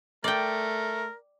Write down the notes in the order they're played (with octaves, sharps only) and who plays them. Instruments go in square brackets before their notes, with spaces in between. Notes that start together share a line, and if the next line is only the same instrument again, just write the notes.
[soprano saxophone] A3 [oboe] A#4 [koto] D5 G5